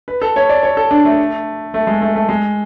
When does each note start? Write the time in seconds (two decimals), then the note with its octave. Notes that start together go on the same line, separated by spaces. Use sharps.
0.08 B4
0.22 A4
0.36 C#5
0.49 D5
0.63 C#5
0.77 A4
0.91 D4
1.05 A3
1.74 A3
1.87 G#3
2.01 A3
2.16 A3
2.29 G#3